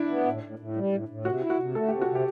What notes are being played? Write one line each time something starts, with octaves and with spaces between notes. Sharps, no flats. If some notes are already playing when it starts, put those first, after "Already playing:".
Already playing: D4 E4
B3
A2
A2
A2
G3
A2
A2
C3 F#4
E4
F#4
C3
A3 A4
C3 G4
F#4
C3
G4